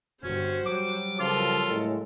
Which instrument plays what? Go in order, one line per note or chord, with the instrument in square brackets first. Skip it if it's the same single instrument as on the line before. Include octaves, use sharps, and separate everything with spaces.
[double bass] G1 [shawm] C#4 [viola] F#4 C5
[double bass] F#3 G3 [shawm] D6
[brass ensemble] C#3 F3 [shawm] F4 [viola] A4 A#4
[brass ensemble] A2 C#3 G#3